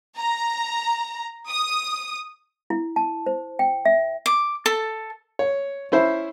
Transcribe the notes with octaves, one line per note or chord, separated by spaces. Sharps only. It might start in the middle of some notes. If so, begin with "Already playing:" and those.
A#5
D#6
E4
A5
C5
G5
E5
D6
A4
C#5
C#4 E4 C5 E5